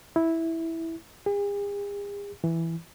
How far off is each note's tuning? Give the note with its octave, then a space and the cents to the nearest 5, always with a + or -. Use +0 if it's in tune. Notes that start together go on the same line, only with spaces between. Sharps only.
E4 -10
G#4 -45
E3 +5